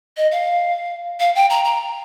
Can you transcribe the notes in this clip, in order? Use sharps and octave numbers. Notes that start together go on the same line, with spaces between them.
D#5
F5
F5
G5
A#5
A#5